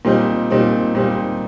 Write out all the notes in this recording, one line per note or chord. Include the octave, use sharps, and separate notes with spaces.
A#2 G3 C4 D#4
A#2 G3 C4 D#4
A#2 G3 C4 D#4